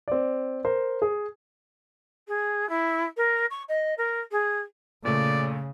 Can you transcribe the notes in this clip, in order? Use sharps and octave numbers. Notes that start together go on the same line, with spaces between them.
C4 D5
A#4 C5
G#4
G#4
E4
A#4
C#6
D#5
A#4
G#4
A#2 C#3 A3 D5